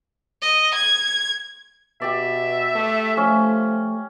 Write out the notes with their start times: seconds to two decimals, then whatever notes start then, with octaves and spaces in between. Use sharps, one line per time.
0.42 D#5
0.75 G#6
2.02 B2 G4 D5 E5
2.76 A3
3.17 F3 A3 C#4